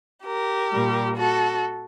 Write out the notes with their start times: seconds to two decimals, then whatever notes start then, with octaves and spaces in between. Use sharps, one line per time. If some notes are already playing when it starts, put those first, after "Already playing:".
0.26 G4 A#4
0.71 A#2 G3
1.16 F#4 A4